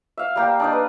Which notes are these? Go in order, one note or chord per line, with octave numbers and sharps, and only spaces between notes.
E5 F5
G3 A#3 G5
D4 D#4 D5
B4